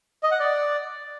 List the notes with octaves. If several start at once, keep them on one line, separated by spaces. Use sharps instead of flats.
D#5
F#5
D5